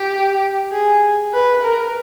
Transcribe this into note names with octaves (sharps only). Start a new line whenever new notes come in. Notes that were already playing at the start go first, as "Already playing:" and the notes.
Already playing: G4
G#4
B4
A#4